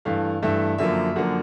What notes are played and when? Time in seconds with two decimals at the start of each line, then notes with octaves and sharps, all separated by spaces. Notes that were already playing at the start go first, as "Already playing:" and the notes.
0.05 G2 E3 A3 F5
0.42 G2 E3 A3 E5
0.78 F#2 D3 F3 A#3 E5
1.15 F#2 D3 F3 A#3 F#5